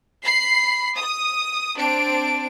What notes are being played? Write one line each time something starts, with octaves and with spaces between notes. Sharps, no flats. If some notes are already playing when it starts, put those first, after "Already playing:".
B5 C7
D#6
C4 D4 D7